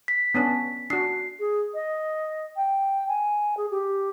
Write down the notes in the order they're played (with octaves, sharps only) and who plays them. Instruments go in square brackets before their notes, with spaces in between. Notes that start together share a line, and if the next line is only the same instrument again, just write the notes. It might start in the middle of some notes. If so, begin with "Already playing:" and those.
[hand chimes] B6
[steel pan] B3 C#4 D4
[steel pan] D4 F#4 [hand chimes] C7
[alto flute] G#4
D#5
G5
G#5
G#4
G4